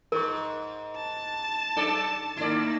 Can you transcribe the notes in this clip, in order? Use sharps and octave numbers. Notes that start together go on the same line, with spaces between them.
G#2 A#4 C#6
A5
F#2 D#4 A4 D5
D#3 A#3 E4 D5